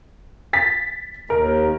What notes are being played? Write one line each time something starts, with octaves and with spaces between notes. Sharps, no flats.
A6 B6
D#2 A#4